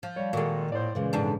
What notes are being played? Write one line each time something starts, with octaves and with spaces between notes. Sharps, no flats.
F3
G3 C#5
A#2 D#3 G#3 F#4 A4
A2 C5 D5
A#2 C#3 E3 G#3
F2 G#2 D4